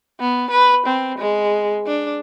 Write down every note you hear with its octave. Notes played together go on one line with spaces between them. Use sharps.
B3
B4
C4
G#3
D4